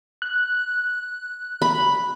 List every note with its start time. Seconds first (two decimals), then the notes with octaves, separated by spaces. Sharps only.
0.22 F#6
1.62 B5